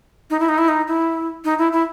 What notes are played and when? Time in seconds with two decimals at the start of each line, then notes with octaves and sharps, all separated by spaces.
0.30 D#4
0.40 E4
0.49 D#4
0.58 E4
0.68 D#4
0.88 E4
1.45 D#4
1.58 E4
1.72 E4